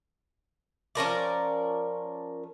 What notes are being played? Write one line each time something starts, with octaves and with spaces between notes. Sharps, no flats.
F3 C#4 A#4 D5